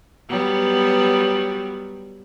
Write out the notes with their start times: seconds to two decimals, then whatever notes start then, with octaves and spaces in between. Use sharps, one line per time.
0.29 F#3 G3 B3